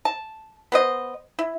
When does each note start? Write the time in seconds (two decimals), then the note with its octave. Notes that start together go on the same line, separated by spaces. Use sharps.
0.05 A5
0.72 B3 C5 D#5
1.39 E4